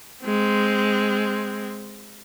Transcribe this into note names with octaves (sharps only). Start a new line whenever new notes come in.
G#3 C4